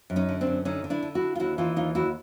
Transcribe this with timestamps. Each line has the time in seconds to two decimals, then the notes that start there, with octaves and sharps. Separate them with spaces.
0.10 F#2
0.16 C#4 D#4
0.29 D3
0.41 C4 D4
0.47 F#2
0.65 D3 C#4 D#4
0.84 D3
0.90 D4 E4
1.03 D3
1.15 E4 F#4
1.21 D3
1.35 F4
1.40 D#2 E4 F#4
1.58 E3 D#4 F4
1.76 D#2 D#4 F4
1.95 D#2 E4 F#4